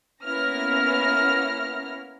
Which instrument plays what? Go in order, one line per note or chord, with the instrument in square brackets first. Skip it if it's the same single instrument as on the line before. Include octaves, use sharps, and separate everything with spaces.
[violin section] A#3 B3 C#4 E4 F6 A#6